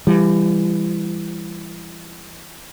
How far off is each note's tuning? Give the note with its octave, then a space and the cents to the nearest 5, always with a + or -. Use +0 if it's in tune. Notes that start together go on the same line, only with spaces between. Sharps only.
E3 +30 G3 +25